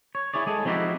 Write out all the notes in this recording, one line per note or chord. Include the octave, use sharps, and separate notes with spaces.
C#5
E4 G#4 C#5 D5
G#3 G#4 A4
F3 C4 D#4 E4 F#4 G4